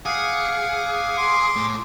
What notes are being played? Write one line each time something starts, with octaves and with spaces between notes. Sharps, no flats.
G#4 F5 F#5 D6
C6 D6
A2